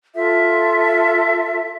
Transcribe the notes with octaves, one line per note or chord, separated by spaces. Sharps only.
F4 A4 E5